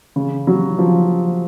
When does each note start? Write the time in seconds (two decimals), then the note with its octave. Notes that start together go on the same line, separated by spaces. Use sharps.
0.16 C#3
0.47 F#3
0.78 F3